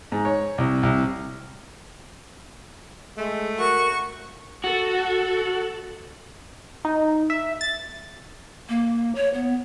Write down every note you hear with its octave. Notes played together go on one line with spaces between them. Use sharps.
G#2
C#5
C2
C2
G#3 A3
F#4 A#4 C#6
F#4 A4
D#4
E5
A6
A#3
C#5
B3